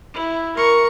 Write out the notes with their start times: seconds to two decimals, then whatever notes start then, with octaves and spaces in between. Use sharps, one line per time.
0.14 E4
0.57 A#4 C#6